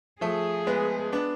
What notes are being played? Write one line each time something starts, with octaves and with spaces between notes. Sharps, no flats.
F3 A3 G#4
G#3 B3
B3 D4